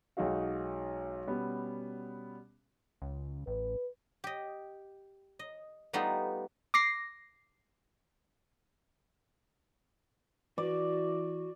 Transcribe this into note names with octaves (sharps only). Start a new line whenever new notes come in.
B1 G#3 D#4 F#4 F5
B2 G3 B3 C#4
C#2
A1 B4
G4 D#5
D#5
G3 A3 B3 D#4 F4 G4
D6 A#6 C7
E3 F#4 D5